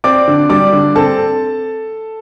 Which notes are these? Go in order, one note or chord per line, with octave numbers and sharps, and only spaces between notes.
C4 D5 D6
D3
G3 D5 D6
D3
C4 A4 A5